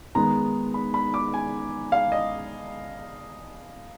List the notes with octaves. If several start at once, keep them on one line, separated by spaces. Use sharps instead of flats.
D#3 G#3 B3 A#5
B5
B5
D6
G#5
F5
D#5